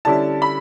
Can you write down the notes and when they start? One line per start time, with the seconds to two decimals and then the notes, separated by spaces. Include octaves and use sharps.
0.05 D3 G3 C#4 E4 A5
0.42 B5